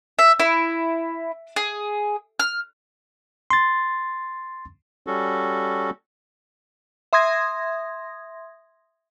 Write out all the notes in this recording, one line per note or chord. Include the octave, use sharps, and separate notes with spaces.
E5
E4
G#4
F6
C6 A6
G3 C#4 F#4 A4
E5 C6 D#6 G#6 A#6